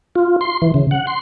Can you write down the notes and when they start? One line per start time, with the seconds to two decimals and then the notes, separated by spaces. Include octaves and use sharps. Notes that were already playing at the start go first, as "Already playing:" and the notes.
0.16 F4
0.41 C6
0.62 E3
0.74 C#3
0.91 F#5
1.07 C6